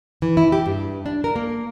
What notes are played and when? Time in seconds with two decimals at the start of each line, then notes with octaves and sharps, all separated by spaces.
0.22 E3
0.37 E4
0.52 G4
0.66 G2
1.06 D4
1.24 A#4
1.36 A#3